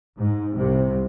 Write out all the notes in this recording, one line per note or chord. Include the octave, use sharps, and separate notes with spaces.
G#2
C2 C3